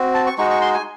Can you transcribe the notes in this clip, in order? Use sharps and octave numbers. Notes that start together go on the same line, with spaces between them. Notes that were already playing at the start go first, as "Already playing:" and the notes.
Already playing: C4 F#4
A5
C#6
G#3 D#4 F#4 C#6
C#6
C6
G#5